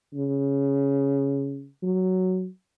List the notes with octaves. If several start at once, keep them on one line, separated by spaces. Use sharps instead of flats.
C#3
F#3